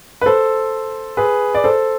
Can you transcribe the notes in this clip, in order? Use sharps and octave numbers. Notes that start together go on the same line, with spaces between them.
B4
A4 C5
G#4 B4
D5
A4 C5